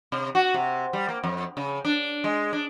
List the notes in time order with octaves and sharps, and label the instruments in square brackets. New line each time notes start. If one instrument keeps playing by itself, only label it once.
[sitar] C3
F#4
C3
G3
A#3
F2
C#3
D4
G#3
D4